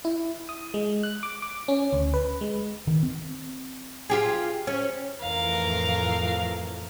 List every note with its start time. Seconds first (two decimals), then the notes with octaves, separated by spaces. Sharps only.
0.05 E4
0.49 D#6
0.74 G#3
1.03 F#6
1.23 D6
1.42 D6
1.68 C#4
1.93 D2
2.14 B4
2.41 G#3
2.87 D#3
3.03 C4
4.10 F4 G4 G#4
4.67 C#4
5.21 F2 A2 E3 A#4 F5